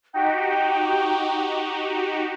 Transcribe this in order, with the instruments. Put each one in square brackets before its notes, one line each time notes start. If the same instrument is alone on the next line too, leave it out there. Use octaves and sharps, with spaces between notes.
[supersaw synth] D#4 F#4 G4 [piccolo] G5